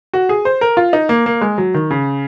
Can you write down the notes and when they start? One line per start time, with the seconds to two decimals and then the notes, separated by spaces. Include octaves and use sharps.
0.14 F#4
0.29 G#4
0.45 C5
0.61 A#4
0.77 F4
0.93 D#4
1.09 A#3
1.26 A#3
1.41 G#3
1.58 F#3
1.74 D#3
1.91 C#3